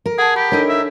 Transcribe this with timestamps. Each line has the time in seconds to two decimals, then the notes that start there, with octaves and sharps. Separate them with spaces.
0.06 A#4
0.19 G#4 F#5 A5
0.36 G4 B5
0.52 D4 D#4 A4 A#4 C#5
0.69 E5